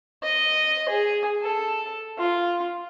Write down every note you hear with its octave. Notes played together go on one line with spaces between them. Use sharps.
D#5
G#4
A4
F4